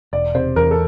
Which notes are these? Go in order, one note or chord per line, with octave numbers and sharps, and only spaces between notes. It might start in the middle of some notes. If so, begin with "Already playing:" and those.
E1 D5
C3 C5
E2 A#4
A4